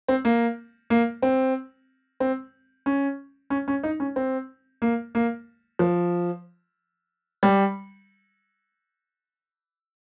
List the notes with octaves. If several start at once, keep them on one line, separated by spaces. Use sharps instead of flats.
C4
A#3
A#3
C4
C4
C#4
C#4
C#4
D#4
C#4
C4
A#3
A#3
F3
G3